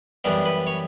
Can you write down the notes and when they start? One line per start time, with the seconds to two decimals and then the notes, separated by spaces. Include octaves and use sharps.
0.24 F#2 E3 G3 B3 D4
0.45 B4
0.67 C#5